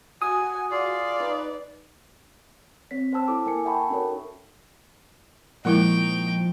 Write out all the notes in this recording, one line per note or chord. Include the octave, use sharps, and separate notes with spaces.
F#4 G#5 D#6
F4 G#4 D5 F5
D#4 B4
C4 C#5 B6
C5 G5 A5 E6
E4 A4 D6
A#3 A#4 G#5 E6 C#7
E5 F#5 G5 A5 B5 C#6
C#4 D#4 F#4 A4 A#4 C#5
A#2 F3 G#3 A#3 D#4 E4 G5 C#6